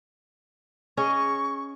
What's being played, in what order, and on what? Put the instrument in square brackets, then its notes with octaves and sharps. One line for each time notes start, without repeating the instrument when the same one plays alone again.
[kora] C#4 G#4 D#5 [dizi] C#6